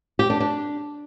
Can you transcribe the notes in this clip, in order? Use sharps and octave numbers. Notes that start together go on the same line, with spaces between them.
G4
D4
D4